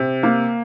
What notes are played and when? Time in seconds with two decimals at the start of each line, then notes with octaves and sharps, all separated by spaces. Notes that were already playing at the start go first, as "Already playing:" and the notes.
Already playing: C3
0.23 A#3